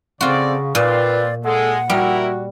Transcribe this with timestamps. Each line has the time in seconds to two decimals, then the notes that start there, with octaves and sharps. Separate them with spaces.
0.21 C#3 C4 F4 F#4 A4 D5
0.75 A#2 C4 F4 B4 D5
1.44 G#3 A4 F#5
1.90 G3 E4 F#4 A#4